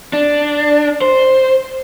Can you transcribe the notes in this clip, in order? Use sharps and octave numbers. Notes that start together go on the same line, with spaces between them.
D4
C5